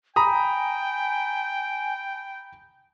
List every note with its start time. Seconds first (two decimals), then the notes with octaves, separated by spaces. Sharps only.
0.16 G5 G#5 A#5 B5 D#6